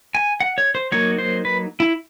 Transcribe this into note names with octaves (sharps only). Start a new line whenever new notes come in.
G#5
F#5
C#5
C5
F#3 A#3 D#4 C#5
C5
B4
E4